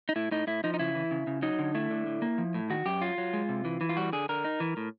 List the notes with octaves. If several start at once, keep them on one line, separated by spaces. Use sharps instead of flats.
D#4
A2 E4
A2 D#4
A2 E4
F3 D#4
D#4
C#3 E4
E3
C#3
C#3
F#3 D#4
D3
A3 E4
D3
A2
A#3
F3
A2
D#3 F#4
F#2 G4
F#3 F4
F#3
G#3
C3
E3
E3
F4
G3 F#4
D3 G#4
D3 A#4
D#4
E3
A2